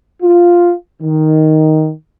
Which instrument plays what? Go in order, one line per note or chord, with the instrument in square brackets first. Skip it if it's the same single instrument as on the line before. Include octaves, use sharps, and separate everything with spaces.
[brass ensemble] F4
D#3